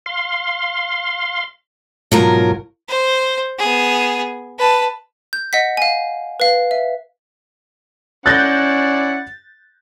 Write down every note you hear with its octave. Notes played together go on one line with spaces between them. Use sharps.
F5 C6
G#2 B2 F3 F#3 A#4
C5
B3 G#4
B4 A5
G6
D#5 F#5 B6
F5 G#5
B4 F5
E5
C#4 E4 D5 F#5 F#6 G6 A6 A#6